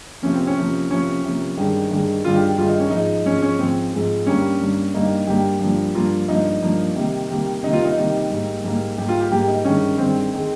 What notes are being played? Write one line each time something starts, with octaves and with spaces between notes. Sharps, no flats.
C3 F3 A#3 C#4
C4
C#4
C3 F3 A#3
C3 F3 A#3 C#4
C3 F3 A#3
G2 D#3 G#3
G2 D#3 G#3
G2 D#3 G#3 F4
G4
G2 D#3 G#3 F4
D#4
C#4
G#2 F3 G#3 D#4
G#2 F3 G#3 C#4
C#4
G#2 F3 G#3 C4
G#2 F3 G#3
G2 G3 A#3 C#4
G2 G3 A#3
G2 G3 A#3 D#4
G2 G3 A#3 G4
G2 F3 A#3
G2 F3 A#3 F4
G2 F3 A#3 D#4
G2 F3 A#3
C3 D#3 G3 A#3
C3 D#3 G3 A#3
C3 D#3 G3 A#3 D#4
F4
D#4
C3 D#3 G3 A#3
G#2 G3 A#3
G#2 G3 A#3
G#2 G3 A#3 G4
F4
G4
G#2 G3 A#3 G4
D#4
G2 D#3 G#3 C#4
G2 D#3 G#3 C4
D#3 G#3